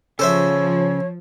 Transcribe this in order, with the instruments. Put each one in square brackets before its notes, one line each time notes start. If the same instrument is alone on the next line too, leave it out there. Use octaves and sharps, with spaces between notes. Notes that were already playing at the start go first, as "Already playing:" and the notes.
[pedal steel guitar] C#3 [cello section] F3 [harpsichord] A4 C5 E5 [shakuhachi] C#5